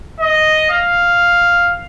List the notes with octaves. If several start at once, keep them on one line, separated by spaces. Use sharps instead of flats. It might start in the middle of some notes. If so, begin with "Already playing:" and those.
D#5
F5